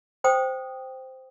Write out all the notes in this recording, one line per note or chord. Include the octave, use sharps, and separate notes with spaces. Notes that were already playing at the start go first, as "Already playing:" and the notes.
C5 G5 D#6